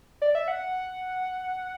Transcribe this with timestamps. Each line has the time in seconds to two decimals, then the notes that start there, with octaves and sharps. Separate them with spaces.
0.22 D5
0.35 E5
0.48 F#5